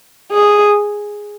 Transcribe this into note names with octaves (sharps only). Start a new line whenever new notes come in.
G#4